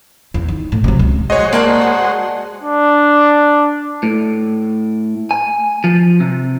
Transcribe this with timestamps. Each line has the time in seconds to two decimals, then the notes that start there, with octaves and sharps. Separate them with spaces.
0.34 E2
0.48 D#3
0.72 A2
0.84 C3 F#3
0.99 C#2
1.30 G#3 F#4 C5 C#5 D#5
1.53 A#3 D5 D#5 A5
1.81 F#5
2.63 D4
4.03 A2
5.31 G#5
5.84 F3
6.20 C3